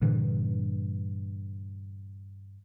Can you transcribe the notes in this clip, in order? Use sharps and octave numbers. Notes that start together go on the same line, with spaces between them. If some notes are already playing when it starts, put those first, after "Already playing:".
G2 A#2 D3 E3